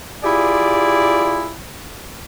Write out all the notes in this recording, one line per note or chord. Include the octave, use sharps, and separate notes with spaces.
E4 F4 G4 G#4 D5